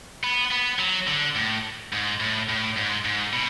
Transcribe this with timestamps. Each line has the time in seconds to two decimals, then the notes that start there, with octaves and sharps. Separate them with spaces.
0.23 B3
0.51 B3
0.79 F#3
1.07 D3
1.35 A2
1.93 G#2
2.20 A2
2.49 A2
2.77 G#2
3.05 G#2
3.33 B2